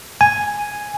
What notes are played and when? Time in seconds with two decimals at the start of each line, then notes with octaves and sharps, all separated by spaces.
0.21 G#5